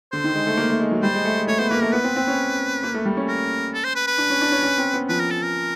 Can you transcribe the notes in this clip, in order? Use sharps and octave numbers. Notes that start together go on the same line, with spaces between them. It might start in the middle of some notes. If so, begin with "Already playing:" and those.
D3 C5
D#3
G#3
A3
A#3
A3
G#3
F#3
G3 C5
G#3
A3
G#3
A3 C#5
B3 C5
A#3 B4
A3 A#4
B3 B4
C4
C4
C#4
A#3
A3
G3
C#4
A#4
A4
C5
B4
B4
D4
C#4
D4
C#4
C#4
C4
B3
F3 B4
A#4
A4
A#4